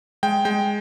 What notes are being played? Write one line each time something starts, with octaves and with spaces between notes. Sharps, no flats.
G#3 G5
G#3 G5